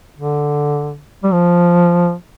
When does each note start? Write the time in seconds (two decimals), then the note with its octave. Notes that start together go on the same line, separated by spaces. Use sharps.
0.18 D3
1.24 G3
1.33 F3